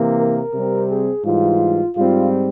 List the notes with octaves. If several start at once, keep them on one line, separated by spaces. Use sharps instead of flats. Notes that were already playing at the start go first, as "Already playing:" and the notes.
Already playing: C3 E3 A#3
A#4
C3 G3 C4
G#4
G#2 E3 G3 F4
G#2 G3 C4 F4